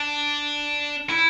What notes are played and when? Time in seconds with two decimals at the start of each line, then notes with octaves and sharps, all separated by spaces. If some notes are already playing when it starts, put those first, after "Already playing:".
Already playing: D4
1.10 E4